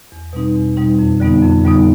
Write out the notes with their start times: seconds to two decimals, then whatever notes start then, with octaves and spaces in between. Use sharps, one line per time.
0.12 E2
0.33 B2 G3 C4 D#4
0.55 E2
0.77 B2 G3 C4 D#4
0.99 F2
1.20 D3 G3 B3 D#4
1.42 F2
1.64 D3 G3 B3 D#4